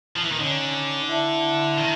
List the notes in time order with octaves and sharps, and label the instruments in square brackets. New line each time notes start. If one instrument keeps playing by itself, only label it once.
[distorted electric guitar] F3
E3
D#3
[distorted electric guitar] D3 [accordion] C#4 D#4
[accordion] D4 E4
[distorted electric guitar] D#3